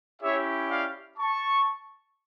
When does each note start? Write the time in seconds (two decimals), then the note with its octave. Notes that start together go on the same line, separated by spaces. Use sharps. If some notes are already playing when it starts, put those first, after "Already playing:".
0.22 C#4 E4 G4 C#5 E5
0.70 D5 F5
1.18 A5 C#6